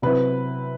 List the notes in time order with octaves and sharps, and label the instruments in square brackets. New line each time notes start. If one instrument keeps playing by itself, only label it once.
[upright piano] C3 F#3 C4 E4 B4